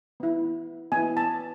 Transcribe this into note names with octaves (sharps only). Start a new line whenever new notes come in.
B3 E4
B3 E4 G#5
A5